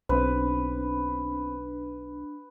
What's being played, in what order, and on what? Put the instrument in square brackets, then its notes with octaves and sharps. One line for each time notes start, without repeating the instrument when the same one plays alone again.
[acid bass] B1 [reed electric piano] C4 C5 [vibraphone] D4 [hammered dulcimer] B4